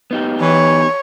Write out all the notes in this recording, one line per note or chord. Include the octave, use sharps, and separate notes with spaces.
B3 D#4 G4
E3 C#5